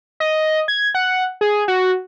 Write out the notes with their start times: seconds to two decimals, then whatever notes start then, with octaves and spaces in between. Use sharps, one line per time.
0.20 D#5
0.68 G#6
0.95 F#5
1.41 G#4
1.68 F#4